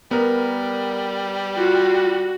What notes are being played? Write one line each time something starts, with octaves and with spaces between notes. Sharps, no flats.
G3 B3 A#4
F4 F#4